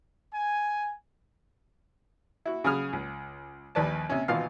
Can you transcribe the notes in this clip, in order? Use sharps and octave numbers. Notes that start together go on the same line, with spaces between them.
G#5
E4 F#4
C#3 F#3 G#4 B5 D#6 F6
C#2
A#1 D#2 B4 D5 A5
C3 C#4
G#1 B2 E3 F4 F5